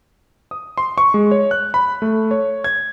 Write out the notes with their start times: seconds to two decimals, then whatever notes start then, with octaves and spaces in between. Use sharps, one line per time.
0.51 D#6
0.78 C6
0.98 C#6
1.14 G#3
1.31 C#5
1.51 F#6
1.74 B5
2.02 A3
2.31 C#5
2.64 G#6